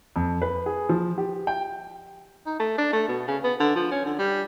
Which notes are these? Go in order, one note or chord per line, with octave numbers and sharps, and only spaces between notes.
F2
B4
G#4
F3
G4
G5
D#4
A3
D4
A3
B2
C#3
B3
D3
F3
C#4
D3
G3